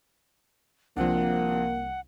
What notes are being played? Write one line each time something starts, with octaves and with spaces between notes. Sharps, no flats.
C2 F3 A#3 C4 D4 F#5